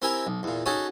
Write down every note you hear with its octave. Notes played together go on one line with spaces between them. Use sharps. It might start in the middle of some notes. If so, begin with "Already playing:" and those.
C4 E4 G4 A#4 E5 G#5
B1
E2 A#2
C#4 D#4 F#4 G#4 A4 C#5